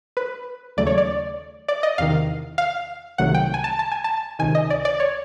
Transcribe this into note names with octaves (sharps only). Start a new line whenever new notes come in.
B4
D#2 C#3 F#3 A3 D5
C#5
D5
D5
D#5
E2 C3 D#3 F5
F5
C2 C3 D#3 F#3 A3 F#5
G5
G#5
A5
A5
G#5
A5
C#2 C3 D#3 G#5
D#5
D5
D5
C#5